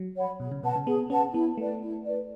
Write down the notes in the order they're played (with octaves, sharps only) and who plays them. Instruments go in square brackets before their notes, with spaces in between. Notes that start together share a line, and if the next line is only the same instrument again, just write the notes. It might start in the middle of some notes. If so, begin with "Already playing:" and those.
Already playing: [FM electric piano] F#3
[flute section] C#5 F#5 B5
[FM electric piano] B2 [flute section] G#4
[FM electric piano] C#3
[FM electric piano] B2 [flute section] B4 F#5 A5
[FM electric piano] C#3
[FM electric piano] B3 [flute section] G#4
[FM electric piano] C#4 [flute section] B4 F#5 A5
[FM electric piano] B3 [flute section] E4
[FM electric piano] A3 [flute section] B4 D5
[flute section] E4
B4 D5